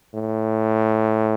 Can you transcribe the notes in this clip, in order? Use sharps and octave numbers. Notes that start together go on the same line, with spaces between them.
A2